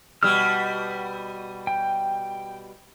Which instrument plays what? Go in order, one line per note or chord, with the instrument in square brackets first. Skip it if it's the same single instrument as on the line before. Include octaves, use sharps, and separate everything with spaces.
[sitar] B2 G3 [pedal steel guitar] E6 F6
[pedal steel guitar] G5